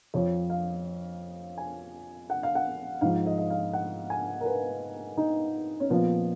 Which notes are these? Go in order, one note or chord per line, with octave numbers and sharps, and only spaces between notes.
F2 F3 C#5
F5
G#5
F#5
F5
F#5
G#2 F3 F5
D#5
D#5
F5
F#5
G#5
A#4
B4
D#4
C#4
A#2 F3 B3